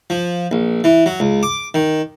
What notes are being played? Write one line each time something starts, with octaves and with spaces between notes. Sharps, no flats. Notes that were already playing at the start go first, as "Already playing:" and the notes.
F3
A#1
E3
F#3
C#2
D6
D#3